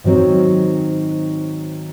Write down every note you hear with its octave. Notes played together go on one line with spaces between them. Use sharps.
G#2 D#3 F#3 C4